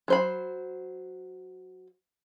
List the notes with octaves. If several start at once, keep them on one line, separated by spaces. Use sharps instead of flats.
F#3 C5 B5